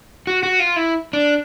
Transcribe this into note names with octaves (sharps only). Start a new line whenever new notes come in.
F#4
F#4
F4
E4
D4